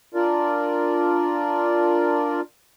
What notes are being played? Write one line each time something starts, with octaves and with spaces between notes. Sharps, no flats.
D4 F4 A#4 D5